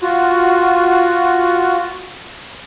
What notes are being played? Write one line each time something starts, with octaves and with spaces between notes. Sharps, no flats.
F4 F#4